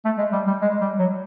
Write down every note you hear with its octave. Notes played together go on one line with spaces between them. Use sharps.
A3
G#3
G3
G3
G#3
G3
F#3